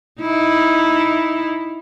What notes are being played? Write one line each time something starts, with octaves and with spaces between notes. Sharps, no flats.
D#4 E4